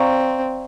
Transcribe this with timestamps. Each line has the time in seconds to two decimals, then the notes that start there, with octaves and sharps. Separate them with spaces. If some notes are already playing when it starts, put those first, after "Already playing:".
Already playing: C4 D5 F5 A#5 C#6